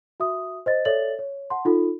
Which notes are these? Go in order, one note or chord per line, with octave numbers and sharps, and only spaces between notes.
F#4 E5 D#6
C5 D#5 A6
A4 C#5 D5 E5 A6 F#7
C#5
F#5 A5 C6
D#4 F4 A4